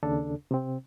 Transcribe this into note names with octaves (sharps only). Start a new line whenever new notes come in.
D#2 C#3 D4 A4
C3 C4